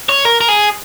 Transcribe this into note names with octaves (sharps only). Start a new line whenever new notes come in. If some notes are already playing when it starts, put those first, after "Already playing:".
C#5
A#4
A#4
G#4